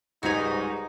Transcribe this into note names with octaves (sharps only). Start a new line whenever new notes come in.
C#2 G#2 G3 D#4 F#4 G#5 F7